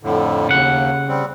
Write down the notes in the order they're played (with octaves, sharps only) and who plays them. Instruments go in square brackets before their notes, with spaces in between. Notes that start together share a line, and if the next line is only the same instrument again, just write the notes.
[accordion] F2 A2 D3
[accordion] D#2 [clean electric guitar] C#3 F#5
[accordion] G3 C4